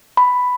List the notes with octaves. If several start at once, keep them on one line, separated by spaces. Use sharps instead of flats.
B5